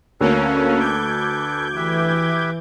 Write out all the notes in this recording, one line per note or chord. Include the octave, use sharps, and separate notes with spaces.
D2 A#3 C#4 A4 B4
D6 G6 G#6
E3 G4 B4 E5